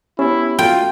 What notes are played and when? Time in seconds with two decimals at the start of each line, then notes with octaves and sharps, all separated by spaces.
0.19 B3 C#4 E4 G4
0.59 F4 F#4 A4 G5 A5